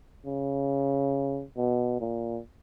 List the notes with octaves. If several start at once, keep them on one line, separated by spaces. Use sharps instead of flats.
C#3
B2
A#2